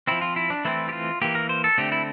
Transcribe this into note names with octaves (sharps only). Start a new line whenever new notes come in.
F3 C4 E4
F4
E4
D4
E3 A3 C4 E4
G4
F4
E3 A#3 G4
A#4
C5
A4
D3 A3 C4 G4
E4